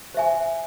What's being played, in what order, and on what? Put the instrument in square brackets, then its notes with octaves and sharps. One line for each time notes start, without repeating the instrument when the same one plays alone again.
[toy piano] C5 E5 G#5